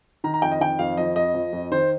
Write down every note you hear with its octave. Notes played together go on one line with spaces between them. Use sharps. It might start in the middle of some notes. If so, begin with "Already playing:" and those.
D#3 A#5
A#5
F2 G5
D#5
D#3 G5
F2 F5
F3 D#5
F2 D#5
F3
F2
D#3 C5